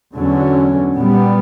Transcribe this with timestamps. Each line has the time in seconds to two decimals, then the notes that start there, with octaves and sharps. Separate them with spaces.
0.15 E2 D3 F#3 C#4
0.94 A#2 G3 B3